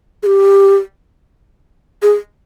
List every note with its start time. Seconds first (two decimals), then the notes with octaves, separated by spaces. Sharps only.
0.23 G#4
0.26 G4
2.02 G#4